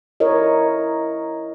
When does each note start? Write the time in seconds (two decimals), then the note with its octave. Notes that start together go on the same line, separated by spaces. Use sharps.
0.20 E4 A#4 C#5 D#5